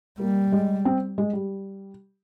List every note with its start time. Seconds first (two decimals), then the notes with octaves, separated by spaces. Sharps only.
0.20 G3 A#3
0.52 G#3
0.85 C4
1.18 G#3
1.33 G3